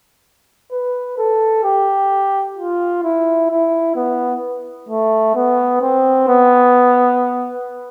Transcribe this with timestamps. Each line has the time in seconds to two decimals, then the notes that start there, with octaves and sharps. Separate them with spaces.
0.72 B4
1.18 A4
1.64 G4
2.57 F4
3.04 E4
3.50 E4
3.96 B3
4.89 A3
5.35 B3
5.82 C4
6.28 B3